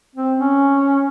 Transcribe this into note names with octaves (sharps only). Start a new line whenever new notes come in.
C4
C#4